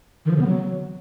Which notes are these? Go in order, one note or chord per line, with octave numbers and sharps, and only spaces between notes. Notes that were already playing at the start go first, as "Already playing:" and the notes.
D#3
F3
C#3
B3
F#3